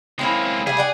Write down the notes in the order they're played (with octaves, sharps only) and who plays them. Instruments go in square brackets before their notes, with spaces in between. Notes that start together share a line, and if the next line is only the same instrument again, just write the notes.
[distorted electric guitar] G#3 A#3 [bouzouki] C4 C#4 E4
[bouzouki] G3 A3 [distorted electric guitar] G#4
[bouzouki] D5 F#5 G5